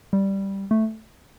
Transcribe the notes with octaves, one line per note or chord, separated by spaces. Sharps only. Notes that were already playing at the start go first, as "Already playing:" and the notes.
G3
A3